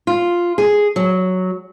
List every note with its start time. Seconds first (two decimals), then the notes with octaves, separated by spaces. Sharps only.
0.07 F4
0.58 G#4
0.96 F#3